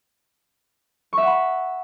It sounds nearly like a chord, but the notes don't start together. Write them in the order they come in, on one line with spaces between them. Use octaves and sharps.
C#6 E5 F#5 B5